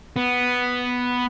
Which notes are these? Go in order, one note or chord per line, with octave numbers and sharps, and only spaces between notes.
B3